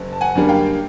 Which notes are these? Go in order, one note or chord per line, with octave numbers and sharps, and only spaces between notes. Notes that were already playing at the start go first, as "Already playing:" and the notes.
Already playing: F#1
A5
F#5 G#5
F#2 D3 G3 A#3
F5 G5